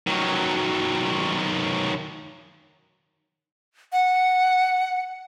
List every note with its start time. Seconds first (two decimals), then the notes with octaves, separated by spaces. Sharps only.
0.07 D#3 F#3
3.93 F#5